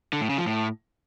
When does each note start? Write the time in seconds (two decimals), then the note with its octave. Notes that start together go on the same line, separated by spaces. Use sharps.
0.13 D3
0.21 A2
0.30 C#3
0.38 F3
0.46 A2